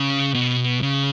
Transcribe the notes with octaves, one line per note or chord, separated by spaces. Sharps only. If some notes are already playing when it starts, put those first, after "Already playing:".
Already playing: C#3
B2
C#3